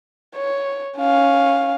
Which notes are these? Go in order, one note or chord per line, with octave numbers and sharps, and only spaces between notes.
C#5
C#4 F5